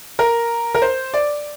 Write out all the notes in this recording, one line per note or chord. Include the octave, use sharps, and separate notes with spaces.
A#4
A#4
C5
D5